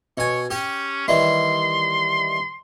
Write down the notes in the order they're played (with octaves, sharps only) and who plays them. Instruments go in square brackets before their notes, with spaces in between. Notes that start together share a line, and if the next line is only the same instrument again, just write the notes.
[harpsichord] B2 G#5 [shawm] C#5
[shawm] C#4 [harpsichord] G4 G5
[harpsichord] D#3 E3 G3 [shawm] C6